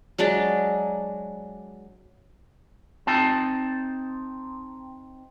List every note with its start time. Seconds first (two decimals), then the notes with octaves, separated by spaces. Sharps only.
0.18 F#3 G#3 D4 D5
3.07 C4 D#4 A5